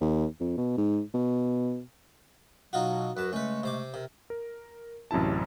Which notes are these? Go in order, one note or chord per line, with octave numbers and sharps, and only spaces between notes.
D#2
F2
B2
G#2
B2
B2 F#3 D#4 F4 F#4
F#2 F#4 B4 A5
C#3 G#3 A3 C#4 B4
C3 C5 D6
C3 A#4
A#4
A1 F#2 C3 E4 A5